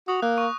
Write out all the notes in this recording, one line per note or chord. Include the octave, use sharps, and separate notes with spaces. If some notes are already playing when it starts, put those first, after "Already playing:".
F#4 D#6
A#3 F#6
C#6